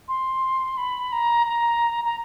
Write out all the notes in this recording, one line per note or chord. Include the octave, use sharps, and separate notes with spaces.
C6
B5
A#5
A#5
A#5